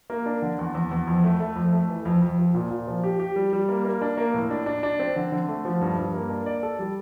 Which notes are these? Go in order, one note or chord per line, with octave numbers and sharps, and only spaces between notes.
A#3
D4
D3
E2
E2
E2
F2
A3
A3
F2
A3
E3
F2
F2
F3
A#2
A#2
F3
G4
G4
G3
G3
A#3
A#3
D4
A#3
A2
D4
D4
D4
C4
D3
D3
A3
F3
G2
G2
A#3
D4
D5
A4
G3